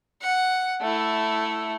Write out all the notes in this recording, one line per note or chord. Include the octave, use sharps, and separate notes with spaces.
F#5
A3 E4